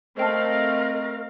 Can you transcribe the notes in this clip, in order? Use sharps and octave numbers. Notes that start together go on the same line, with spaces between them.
A3 C4 A#4 C5 D#5 F5 G5 A5